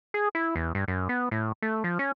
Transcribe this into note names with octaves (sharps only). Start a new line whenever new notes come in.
G#4
E4
E2
G2
F#2
B3
A2
A3
F3
C#4